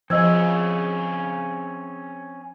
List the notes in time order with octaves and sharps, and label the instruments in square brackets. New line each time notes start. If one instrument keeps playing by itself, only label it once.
[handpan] F3 [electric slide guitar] C4 C#4 G#4 [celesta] D#5 E6 G#6